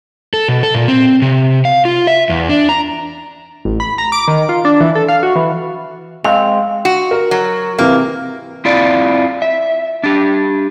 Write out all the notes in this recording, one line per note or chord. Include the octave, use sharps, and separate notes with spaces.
A4
B2
A4
A#2
C4
C3
F5
F4
E5
E2
D4
A#5
A1
B5
A#5
D6
D#3
F4
D4
E3
A4
F5
F#4
E3
G#3 C4 F5
F#4
A#4
F#3
C3 E3 A#3
C4 E4 F4 D5
E5
D4 G4